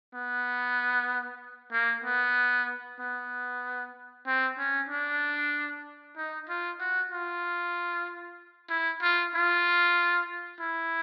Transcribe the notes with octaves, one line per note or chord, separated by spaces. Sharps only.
B3
A#3
B3
B3
C4
C#4
D4
D#4
F4
F#4
F4
E4
F4
F4
E4